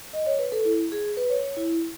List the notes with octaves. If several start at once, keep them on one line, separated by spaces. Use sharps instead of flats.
D#5
C#5
B4
A4
E4
G#4
B4
C#5
C#5
E4